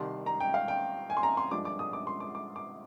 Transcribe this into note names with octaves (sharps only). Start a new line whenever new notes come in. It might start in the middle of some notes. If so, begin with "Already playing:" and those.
Already playing: C2 C3 D#3 G3 C6
A#5
G5
F5
G5
G#5
C6
A#5
C6
G2 F3 G#3 D4 D6
D6
D#6
D6
C6
D6
D6
D6